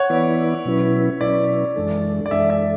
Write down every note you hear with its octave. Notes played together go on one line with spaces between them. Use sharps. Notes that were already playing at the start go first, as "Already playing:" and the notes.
Already playing: C#5 F#5
E3 B3 E4 B4 D5
B2 F#3 C#4 E4 B4
B2 F#3 C#4 E4 B4 D5
F#2 E3 G#3 D4 A4
D5
F#2 E3 G#3 D4 A4 E5
E5